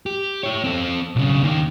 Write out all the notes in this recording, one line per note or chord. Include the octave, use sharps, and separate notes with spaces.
G4
E4 C#5
C4 A4
B1 C#3
D#2 D#3